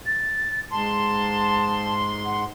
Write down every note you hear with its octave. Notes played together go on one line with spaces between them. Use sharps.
A6
G#2 A5 C6
F#5